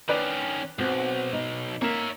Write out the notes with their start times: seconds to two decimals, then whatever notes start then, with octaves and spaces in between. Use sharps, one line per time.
0.09 D#3 C#4 D4 B4 D5
0.78 B1 C4 F#4
1.33 D#4
1.82 A#3 C#5 E5